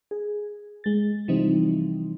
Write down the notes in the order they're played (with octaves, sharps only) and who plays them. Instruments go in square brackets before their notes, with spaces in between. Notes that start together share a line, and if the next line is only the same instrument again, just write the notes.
[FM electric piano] G#4
G#3 A6
C3 E3 F3 G3 C4 D#4